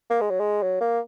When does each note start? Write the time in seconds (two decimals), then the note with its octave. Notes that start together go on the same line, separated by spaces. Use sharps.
0.10 A#3
0.21 G#3
0.30 F#3
0.40 G#3
0.62 F#3
0.80 A#3